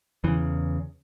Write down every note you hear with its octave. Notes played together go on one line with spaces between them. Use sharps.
E2 C#3 E3